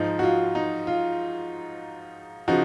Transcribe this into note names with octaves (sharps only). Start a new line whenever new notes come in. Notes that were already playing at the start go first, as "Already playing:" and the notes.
Already playing: G#2 F3 D#4
F#4
F4
D#4
F4
C#3 F3 D#4 F#4